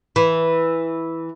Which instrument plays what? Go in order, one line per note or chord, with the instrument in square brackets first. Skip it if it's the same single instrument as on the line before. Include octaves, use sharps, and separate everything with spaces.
[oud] E3